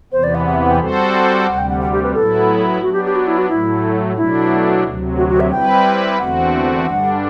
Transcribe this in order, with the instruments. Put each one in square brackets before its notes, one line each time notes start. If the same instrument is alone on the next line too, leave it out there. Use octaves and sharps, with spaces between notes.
[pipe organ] E2 C3 E3 B3 [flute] C5
[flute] D5
F#5
F#5
E5
F#5
G5
[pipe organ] G3 C4 F#4 A4 C5
[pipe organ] D2 C3 G3 [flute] F#5
[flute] G5
F#5
F#5
G4
B4
[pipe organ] A2 F#3 B3 E4 [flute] A4
[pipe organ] F#3 B3 D4 [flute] F#4
[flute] G4
G4
F#4
E4
F#4
[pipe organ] A2 F#3 A3 [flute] E4
[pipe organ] B2 F#3 A3 D4 [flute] E4
[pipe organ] D2 C3 F#3
[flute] F#4
F#4
E5
[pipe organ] G3 C4 E4 B4 [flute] G5
[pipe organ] E2 D3 A3 C4 F#4 [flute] F#5
[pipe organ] G2 D3 G3 D4 [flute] F#5